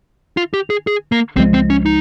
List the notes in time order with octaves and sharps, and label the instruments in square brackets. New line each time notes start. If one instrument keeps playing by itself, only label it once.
[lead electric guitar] F4
G4
G#4
G#4
A#3
[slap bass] C#2 C#3 F3 G#3 [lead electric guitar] C4
[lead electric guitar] C4
C#4
D#4